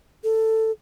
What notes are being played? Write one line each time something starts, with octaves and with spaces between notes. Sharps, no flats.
A4